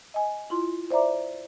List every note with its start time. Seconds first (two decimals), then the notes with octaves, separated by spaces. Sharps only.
0.14 D#5 G#5
0.50 E4 F4 C6
0.91 C5 D5 E5 A#5 D6